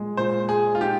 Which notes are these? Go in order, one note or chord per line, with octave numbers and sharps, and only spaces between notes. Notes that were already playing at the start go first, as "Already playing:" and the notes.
Already playing: A#2 G#3
A#2 C5
G#3 G#4
F4
D#4 G4